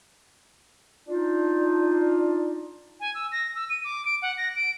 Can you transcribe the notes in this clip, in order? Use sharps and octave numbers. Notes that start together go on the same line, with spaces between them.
D4 D#4 F4
G#5
E6
A#6
E6
D#7
D6
D7
F#5
A#6
D7